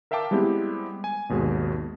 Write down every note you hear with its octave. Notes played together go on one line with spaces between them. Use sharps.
A#4 E5 F5 G5 A5 D6
G3 G#3 B3 C4 E4 G4
G#5
G#1 D#2 B2 G#3